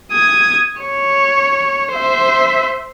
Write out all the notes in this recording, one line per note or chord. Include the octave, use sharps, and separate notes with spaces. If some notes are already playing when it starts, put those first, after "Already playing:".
D#6 G#6
C#5
C5 E5